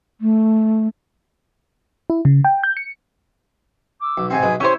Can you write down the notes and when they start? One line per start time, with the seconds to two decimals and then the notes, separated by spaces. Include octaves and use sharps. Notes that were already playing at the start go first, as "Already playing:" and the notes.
0.20 A3
2.10 E4
2.25 C#3
2.45 G5
2.63 G6
2.77 C#7
4.00 D6 E6
4.18 B1
4.30 G#2 C3 C4 G#5
4.43 B1 G#3 B4
4.60 C#4 E4 G4 C5 C#5 E5